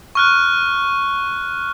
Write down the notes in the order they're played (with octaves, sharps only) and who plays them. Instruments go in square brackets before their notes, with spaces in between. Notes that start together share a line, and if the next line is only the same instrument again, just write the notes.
[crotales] C#6 F6 F#6